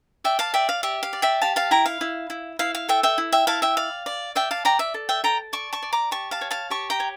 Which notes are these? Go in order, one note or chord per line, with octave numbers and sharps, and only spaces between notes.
D5 E5 G5
F5 A5
D5 E5 G5
F5
G4 E5
F5
D5
E5 G5
G4 F5 A5
F5 A5
E4 G5 A#5
F5
E4
E4
E4 F5
F5
A4 E5 G5
E5 G5
E4
E5 G5
E4 F5 A5
E5 G5
D5 F5
D5
D5 E5 G5
F5 A5
D5 G5 A#5
E5
A4
E5 G5
A4 G5 A#5
D5 A5 C#6
A5 C#6
D5
A#5 D6
G4 A5 C#6
F5 A5
C#5
F5 A5
G4 A5 C#6
G5 A#5
C#5